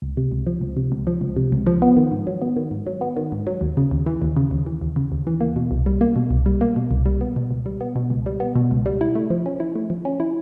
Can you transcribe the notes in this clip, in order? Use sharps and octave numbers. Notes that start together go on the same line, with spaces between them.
C#2
C3
C#2
F3
C#2
C3
C#2
F3
C#2
C3
C#2
F3
B3
D#3
G#2
F#3
B3
D#3
G#2
F#3
B3
D#3
G#2
F#3
D#2
C#3
D#2
E3
D#2
C#3
D#2
E3
D#2
C#3
D#2
E3
A#3
B2
C2
G3
A#3
B2
C2
G3
A#3
B2
C2
G3
B3
B2
C#2
G3
B3
B2
C#2
G3
B3
B2
C#2
G3
E4
A3
F3
C#4
E4
A3
F3
C#4
E4